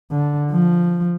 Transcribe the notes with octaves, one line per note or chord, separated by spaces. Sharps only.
D3
F3